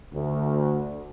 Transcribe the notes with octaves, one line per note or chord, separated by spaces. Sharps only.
D2